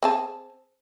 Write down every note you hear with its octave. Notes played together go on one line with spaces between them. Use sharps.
C4 G#4 A5